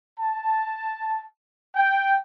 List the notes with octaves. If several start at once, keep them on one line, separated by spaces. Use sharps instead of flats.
A5
G5